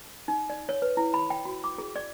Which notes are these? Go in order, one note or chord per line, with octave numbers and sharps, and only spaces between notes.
D#4
D5
C#5
B4
E4
B5
G5
F#4
D6
G#4
D5